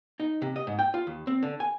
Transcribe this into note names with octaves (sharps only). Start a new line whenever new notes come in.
D#4
C3
D#5
G#2
G5
F4
D#2
C4
D3
G#5